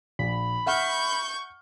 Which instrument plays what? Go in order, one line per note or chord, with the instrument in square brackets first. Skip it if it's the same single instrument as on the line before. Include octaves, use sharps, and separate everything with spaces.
[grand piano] A#1 [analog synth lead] B5
[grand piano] E5 F#5 F6 [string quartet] C#6 G6